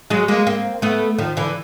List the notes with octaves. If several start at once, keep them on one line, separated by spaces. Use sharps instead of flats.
F#3 G#3
G#3 A#3
A#3 C4
A3 B3
D#3 F3
D3 E3